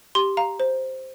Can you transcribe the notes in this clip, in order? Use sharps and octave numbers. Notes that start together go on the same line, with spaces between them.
G4 C6
F5 A#5
C5